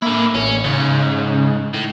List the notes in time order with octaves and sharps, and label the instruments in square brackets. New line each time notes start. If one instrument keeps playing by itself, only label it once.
[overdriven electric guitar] D3 E4 [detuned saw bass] A#3
[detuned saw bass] A1 [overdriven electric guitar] C#4
[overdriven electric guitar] G#2 [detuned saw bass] C#3
[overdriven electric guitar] A2